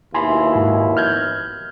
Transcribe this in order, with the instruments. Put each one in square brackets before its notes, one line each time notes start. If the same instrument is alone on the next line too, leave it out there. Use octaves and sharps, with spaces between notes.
[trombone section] D#2 B2 E4 [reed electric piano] G#5 B5 C6
[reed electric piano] G#2
F6 G6 G#6